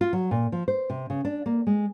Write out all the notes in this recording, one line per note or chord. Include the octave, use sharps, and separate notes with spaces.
F4
F#3
A#2
F3
C5
C3
C#3
D4
A#3
G#3